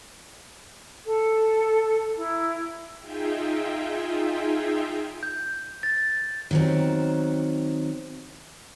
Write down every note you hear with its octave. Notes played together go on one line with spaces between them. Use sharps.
A4
E4 A#5
D#4 F4 G#4 E5 G5
G6
A6
D#3 F#3 C4